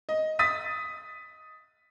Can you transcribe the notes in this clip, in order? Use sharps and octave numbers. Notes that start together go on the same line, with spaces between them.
D#5
D#6 A6 B6 D#7